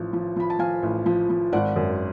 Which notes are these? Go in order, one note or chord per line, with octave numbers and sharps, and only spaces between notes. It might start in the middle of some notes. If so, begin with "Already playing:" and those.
Already playing: A1 F3
F3
F3 B5
A5
F3 F5 G#5
A1
F3
F3
G#1 D5 F#5
F#2